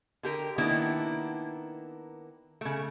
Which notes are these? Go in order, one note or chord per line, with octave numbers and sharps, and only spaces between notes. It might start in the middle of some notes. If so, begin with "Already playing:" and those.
D3 G4 A#4
D#3 A#3 B3 D4 E4
C#3 A3